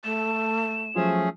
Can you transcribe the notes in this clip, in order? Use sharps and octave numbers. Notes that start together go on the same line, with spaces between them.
A3 E7
F3 F#3 A3 C#4 F4 G#4